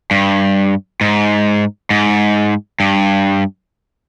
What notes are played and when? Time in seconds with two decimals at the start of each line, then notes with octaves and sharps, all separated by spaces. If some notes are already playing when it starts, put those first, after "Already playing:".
0.11 G2
1.01 G#2
1.90 G#2
2.80 G2